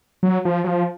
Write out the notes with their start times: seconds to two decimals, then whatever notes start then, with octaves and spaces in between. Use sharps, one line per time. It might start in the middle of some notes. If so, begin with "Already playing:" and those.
0.23 F#3
0.45 F3
0.64 F#3
0.68 F3